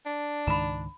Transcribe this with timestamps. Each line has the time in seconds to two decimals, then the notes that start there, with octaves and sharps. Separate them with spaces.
0.06 D4
0.47 C#2 G#2 D#3 A#5 B5